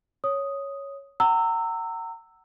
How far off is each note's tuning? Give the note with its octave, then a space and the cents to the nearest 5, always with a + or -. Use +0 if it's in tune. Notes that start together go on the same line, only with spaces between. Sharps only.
C#5 +0 D#6 +0
F#5 +30 A#5 -30 E6 +0